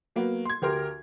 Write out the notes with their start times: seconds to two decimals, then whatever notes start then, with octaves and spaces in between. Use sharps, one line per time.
0.16 F#3 A#3 B3
0.45 C6 G#6
0.62 D2 G4 A#4 C6